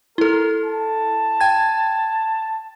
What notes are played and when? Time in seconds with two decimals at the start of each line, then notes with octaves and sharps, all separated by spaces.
0.18 E4 A4 A#4
0.65 A5
1.40 G5 G#6